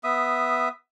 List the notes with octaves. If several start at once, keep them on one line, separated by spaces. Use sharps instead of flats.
B3 E5 D#6